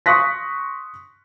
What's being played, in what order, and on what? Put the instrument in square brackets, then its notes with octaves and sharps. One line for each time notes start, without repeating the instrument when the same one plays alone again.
[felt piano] C6 C#6 D#6 F#6 A#6 B6